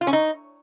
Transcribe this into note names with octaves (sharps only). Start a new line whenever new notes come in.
F4
C#4
D#4